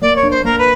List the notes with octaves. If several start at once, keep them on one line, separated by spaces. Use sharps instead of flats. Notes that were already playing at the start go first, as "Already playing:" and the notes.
A#3 D5
C#5
D4
C5
A#3 A#4
B4